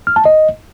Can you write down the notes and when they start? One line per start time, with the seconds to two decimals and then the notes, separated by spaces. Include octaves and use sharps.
0.07 F6
0.16 A5
0.25 D#5